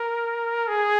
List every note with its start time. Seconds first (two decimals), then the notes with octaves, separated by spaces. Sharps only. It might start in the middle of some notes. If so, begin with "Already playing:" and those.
Already playing: A#4
0.68 G#4